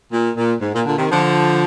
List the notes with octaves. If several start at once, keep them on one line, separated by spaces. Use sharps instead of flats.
A#2
A#2
G#2
A#2
A#2 D3
C3 D#3
D3 F3